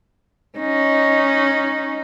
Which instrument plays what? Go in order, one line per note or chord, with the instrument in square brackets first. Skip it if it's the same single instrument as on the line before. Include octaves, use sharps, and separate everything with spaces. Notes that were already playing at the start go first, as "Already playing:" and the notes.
[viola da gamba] C#4 D#4